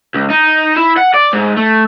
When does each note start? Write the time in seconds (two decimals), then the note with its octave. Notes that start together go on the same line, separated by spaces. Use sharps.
0.14 C#2
0.30 D#4
0.76 E4
0.97 F#5
1.14 D5
1.33 G#2
1.57 A3